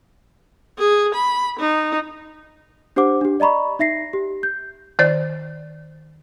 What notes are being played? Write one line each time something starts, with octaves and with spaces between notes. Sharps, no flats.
G#4
B5
D#4
D4 G4 C5 F#5 D6
D4 G4
D5 D#5 A#5 B5 C#6
D#4 E5 A#6 C7
G4
G6
D#3 C5 D5 A6